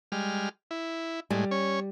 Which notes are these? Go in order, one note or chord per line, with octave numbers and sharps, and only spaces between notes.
G3 G#3 F6
E4
A2 G3 G#3
C#4 C#5